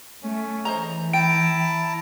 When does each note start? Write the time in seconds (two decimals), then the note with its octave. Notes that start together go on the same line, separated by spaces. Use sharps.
0.23 A3 C#4
0.65 E3 C5 D#5 A#5
1.13 E4 G5 A5 A#5 D7